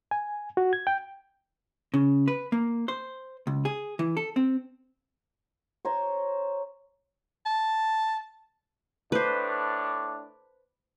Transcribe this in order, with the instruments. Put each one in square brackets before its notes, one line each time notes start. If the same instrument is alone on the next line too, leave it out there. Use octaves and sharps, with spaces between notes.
[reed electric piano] G#5
F#4
G#6
G5
[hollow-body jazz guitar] C#3
B4
A#3
C5
C#2
G#4
E3
A4
C4
[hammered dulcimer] C5 C#5 A#5 C6
[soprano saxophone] A5
[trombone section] A2 D4 [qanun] B4 C5